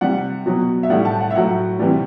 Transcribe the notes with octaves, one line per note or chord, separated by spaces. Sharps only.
C3 G3 F#5
B2 F#3
E5
A2 G3 F#5
A5
F#5
E5
A2 F#3 F#5
C3 E3 G3